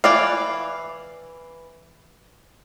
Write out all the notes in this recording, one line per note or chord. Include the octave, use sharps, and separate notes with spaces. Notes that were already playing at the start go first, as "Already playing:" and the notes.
E3 D5 F5